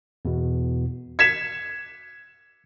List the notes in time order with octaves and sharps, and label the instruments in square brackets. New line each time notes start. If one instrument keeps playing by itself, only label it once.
[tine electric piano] E2 B2
[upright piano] G#6 B6 E7 [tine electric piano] C#7